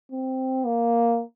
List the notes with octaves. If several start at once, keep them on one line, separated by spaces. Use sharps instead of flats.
C4
A#3